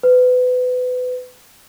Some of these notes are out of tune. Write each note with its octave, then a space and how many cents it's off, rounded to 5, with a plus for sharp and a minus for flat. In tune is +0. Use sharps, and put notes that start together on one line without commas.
B4 +25